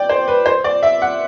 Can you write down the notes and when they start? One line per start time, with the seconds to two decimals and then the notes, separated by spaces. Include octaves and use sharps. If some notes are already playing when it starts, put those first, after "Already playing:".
Already playing: D5 G5
0.09 C5
0.28 B4
0.46 C5
0.64 D5
0.83 E5
1.02 F#5